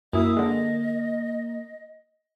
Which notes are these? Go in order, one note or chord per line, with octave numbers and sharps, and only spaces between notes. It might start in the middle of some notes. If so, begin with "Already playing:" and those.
F#2 A#3 E4 E5 D#6
D3 G#3 D#5